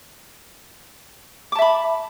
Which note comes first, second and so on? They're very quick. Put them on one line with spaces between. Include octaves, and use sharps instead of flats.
D6 A5 E5 B5